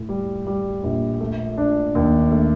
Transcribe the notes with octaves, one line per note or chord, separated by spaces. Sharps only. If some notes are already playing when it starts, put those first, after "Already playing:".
Already playing: A2
G3
G3
A#1
A3
D4
D#2
A3